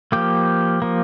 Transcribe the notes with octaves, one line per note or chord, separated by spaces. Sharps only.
F3 A#3 G4
F3 A#3